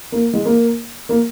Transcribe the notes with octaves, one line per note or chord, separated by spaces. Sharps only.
A#3
G#3
A#3
A#3